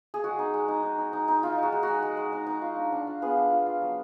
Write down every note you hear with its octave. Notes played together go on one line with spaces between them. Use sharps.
G#4
G#3 F#4
D#4
G#3
D#4
D#4
D#4
D#4
D#4
D#4 F4
G#3 F#4
G#3
G#3 F#4
G#3
G#3
D#4
D#4
F4
D4
D4
F4
B3 F4 G#4
D4
F4
F4
F#3